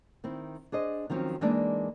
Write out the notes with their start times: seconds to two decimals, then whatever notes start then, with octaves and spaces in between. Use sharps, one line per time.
0.24 D#3 C4 E4
0.72 D4 G#4 C5 D#5
1.10 D#3 F3 F#3 C4 C#4
1.41 E3 G#3 A#3 D4 D#4 D5